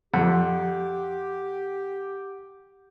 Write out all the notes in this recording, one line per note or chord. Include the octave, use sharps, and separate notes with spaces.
F2 G4 F#5